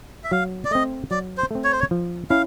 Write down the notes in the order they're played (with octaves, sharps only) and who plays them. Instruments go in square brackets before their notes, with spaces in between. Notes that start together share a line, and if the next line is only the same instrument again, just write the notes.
[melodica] E5
[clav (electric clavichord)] F#3 [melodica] F5
[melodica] D5
[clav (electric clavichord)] A3 C4 [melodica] D#5
[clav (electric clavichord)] F#3 [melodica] D5
[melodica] C5
[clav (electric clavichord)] A3 C4
[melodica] C#5
C5
C#5
[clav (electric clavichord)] F3
[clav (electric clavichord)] C#4 E4 [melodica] F5